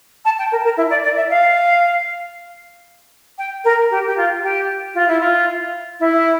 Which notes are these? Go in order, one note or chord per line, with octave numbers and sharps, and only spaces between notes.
A5
G5
A#4
A#4
E4
D5
D5
E5
F5
G5
A#4
G4
G4
F4
G4
F4
E4
F4
E4